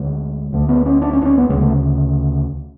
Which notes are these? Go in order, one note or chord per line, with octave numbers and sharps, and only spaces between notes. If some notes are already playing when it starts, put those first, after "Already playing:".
Already playing: D2 D3 G#3
D2 D3 A3
B3
C#4
D4
C#4
D4
C#4
B3
D2 C#3 G#3
A3